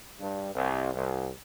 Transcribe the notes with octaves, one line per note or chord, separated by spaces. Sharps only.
G2
C2
C2